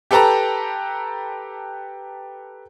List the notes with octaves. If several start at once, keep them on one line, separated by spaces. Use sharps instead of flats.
G4 A4 B4 G5 A5 A#5